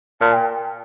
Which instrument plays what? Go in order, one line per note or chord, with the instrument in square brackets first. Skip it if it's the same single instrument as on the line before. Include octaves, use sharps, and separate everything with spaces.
[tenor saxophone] A#2 [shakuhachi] A5
[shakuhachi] G5